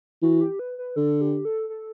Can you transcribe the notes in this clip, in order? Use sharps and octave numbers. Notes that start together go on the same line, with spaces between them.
E3 F#4
G4
B4
B4
D3 A4
G4
A4
A4